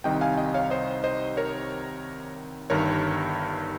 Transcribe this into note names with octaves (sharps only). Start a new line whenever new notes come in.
C2 C3 D#3 D#5 G5
F5 G#5
D#5 G5
C#5 F5
C5 D#5
C5 D#5
A#4 C#5
G1 G2 D#3 A#4 C#5